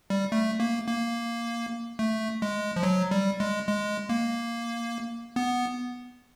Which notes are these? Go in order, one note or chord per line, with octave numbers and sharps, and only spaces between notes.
G3
A3
A#3
A#3
A3
G#3
F3
F#3
G3
G#3
G#3
A#3
B3